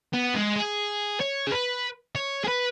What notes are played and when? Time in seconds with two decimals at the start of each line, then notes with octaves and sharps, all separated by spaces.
0.13 B3
0.35 G#3
0.56 G#4
1.20 C#5
1.47 G#4
1.52 B4
2.15 C#5
2.44 G#4
2.48 B4